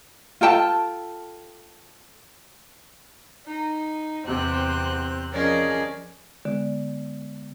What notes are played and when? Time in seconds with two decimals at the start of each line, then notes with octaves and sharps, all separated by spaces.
0.41 F4 A4 G5 A5
3.45 D#4
4.27 E2 C3 C4 F#6
5.32 F3 C#4 G#4 A#4 D5 D#5
6.45 D3 G#3 B3